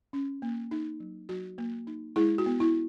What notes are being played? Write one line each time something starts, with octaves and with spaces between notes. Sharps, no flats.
C#4
A#3
D#4
F#3
F#3 F#4
A#3
D#4
G#3 E4 G#4
F#4
B3
E4